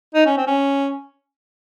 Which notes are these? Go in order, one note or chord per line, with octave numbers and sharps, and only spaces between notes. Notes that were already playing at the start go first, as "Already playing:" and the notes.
D#4
C#4
C4
C#4